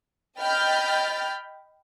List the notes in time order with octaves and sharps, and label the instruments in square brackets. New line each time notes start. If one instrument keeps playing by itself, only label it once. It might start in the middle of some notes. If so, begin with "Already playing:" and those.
[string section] D#5 G5 B5 F6 G6 A6